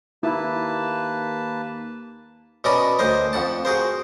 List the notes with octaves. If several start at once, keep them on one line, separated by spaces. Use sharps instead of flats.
D#2 A#3 E4 B4 A5
B2 C#4 A#4 D5 D#5 B5
D2 A#4 C5 D#5
F2 F#5 A5
F#4 G#4 A#4 C5